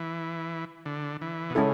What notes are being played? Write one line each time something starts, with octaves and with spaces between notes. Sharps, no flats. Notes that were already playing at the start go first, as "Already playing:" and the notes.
Already playing: E3
D3
E3
B2
C#3 G#3 C#4 E4 A4